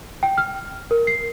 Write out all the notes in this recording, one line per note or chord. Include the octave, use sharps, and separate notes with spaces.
G5
F6
A#4
C7